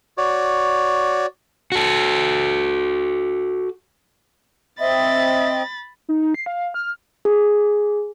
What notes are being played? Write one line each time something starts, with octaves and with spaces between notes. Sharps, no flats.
F#4 C#5 D5
F#4 A4
C4 D#5 E5 B5 A6
D#4
D#4
C7
F5
F6
G#4